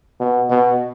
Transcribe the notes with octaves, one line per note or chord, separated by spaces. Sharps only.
B2
B2